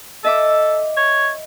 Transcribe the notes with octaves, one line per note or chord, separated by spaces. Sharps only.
A4 D#5 E5 D6
C#5